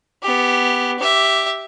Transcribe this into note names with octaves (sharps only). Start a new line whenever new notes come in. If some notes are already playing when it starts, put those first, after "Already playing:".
B3 G4
G4 E5